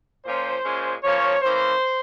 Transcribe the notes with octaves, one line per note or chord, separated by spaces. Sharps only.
A#2 F3 A#3 C#4 C5
A#2 G#3 C#4
F3 A#3 C#4 C#5
E3 A#3 C#4 C5